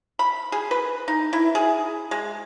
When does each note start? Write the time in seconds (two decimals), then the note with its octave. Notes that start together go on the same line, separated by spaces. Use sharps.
0.19 B5
0.52 G#4
0.71 B4
1.08 D#4
1.33 E4
1.55 G#4
2.11 G#3